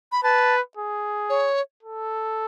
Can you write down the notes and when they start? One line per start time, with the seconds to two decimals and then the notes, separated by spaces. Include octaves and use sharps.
0.12 B5
0.23 B4 A5
0.77 G#4
1.30 C#5
1.83 A4